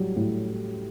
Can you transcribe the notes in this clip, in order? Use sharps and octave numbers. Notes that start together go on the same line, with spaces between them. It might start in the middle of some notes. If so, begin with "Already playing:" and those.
Already playing: A2 F#3 G3
A2